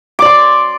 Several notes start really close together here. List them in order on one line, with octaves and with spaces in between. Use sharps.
D6 D5 C6